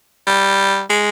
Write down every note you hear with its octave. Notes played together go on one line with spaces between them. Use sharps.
G3
G#3